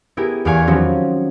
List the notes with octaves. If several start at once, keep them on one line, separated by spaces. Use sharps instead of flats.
B3 E4 G4 G#4 A#4
E2 D5 F5 G#5 C#6
D#3 F3 F#3 C4 C#4